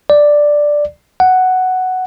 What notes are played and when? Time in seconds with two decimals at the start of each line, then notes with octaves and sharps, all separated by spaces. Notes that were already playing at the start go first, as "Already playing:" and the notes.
0.10 D5
1.20 F#5